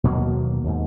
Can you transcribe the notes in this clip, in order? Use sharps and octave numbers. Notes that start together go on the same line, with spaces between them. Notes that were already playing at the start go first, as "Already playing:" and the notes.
D#2 B2 F#3 A#3
D#2 G#2